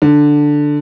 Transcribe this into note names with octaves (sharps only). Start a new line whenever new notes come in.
D3